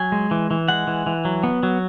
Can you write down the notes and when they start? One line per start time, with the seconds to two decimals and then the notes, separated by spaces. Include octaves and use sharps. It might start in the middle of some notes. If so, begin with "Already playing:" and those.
Already playing: F#3 G#5
0.12 G#3
0.31 E3
0.51 E3
0.68 G#3 F#5
0.87 E3
1.07 E3
1.25 F#3
1.43 B3
1.63 F#3